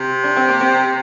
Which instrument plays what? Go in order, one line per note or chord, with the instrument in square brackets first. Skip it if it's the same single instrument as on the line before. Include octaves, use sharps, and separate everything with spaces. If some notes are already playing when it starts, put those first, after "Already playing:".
Already playing: [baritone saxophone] C3
[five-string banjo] D4
C4
A#3
C4